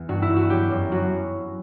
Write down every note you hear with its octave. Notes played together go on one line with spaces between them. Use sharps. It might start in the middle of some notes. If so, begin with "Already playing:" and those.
Already playing: E2
G2 F#4
E4
G2
F#4
F#3 G4
F#2
F#3 F#4